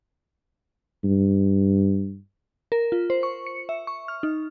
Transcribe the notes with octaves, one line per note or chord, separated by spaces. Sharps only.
G2
A#4
F4
C5
C#6
C#7
E5
C#6
F6
D#4